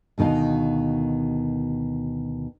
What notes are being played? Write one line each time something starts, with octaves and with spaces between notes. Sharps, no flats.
D2 B2 D#3 D#4 F5